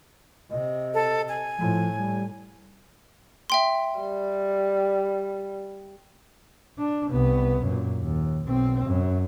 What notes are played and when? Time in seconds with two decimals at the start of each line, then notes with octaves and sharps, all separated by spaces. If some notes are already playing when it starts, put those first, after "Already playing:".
0.51 C3 D#5
0.94 A4
1.29 G#5
1.58 A2 F3
1.97 G3
3.50 E5 G5 C6
3.99 G3
6.78 D4
7.11 C2 B3
7.63 F#2 A#2
8.00 D#2
8.46 B1 C4
8.86 F#2